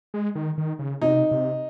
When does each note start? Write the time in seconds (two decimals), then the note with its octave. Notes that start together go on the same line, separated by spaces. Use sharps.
0.14 G#3
0.35 D#3
0.58 D#3
0.79 C#3
1.02 C3 D#4
1.31 C3